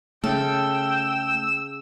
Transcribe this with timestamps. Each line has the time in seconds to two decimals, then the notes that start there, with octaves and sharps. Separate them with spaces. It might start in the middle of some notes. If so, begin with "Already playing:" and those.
0.24 C#3 A3 A4 G5 E6